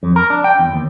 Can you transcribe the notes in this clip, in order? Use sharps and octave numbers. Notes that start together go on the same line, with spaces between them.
F2
A#4
D4
G5
E2
D#2